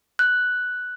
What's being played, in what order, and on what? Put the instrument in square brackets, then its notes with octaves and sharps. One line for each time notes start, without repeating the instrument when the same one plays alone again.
[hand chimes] F#6